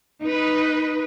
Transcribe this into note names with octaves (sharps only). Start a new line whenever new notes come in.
D#4 B4